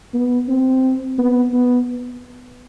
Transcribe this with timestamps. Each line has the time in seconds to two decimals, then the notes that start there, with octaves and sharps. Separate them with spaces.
0.14 B3
0.48 C4
1.18 B3
1.54 B3